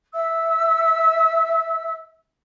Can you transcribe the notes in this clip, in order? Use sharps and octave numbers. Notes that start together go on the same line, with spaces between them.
E5 E6